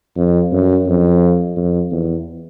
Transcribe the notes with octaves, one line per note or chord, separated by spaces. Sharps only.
F2
F#2
F2
F2
E2